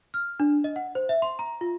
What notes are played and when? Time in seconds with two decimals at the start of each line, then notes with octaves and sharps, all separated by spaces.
0.14 F6
0.40 D4
0.64 D#5
0.76 F#5
0.95 C5
1.09 E5
1.22 C6
1.39 A#5
1.61 F4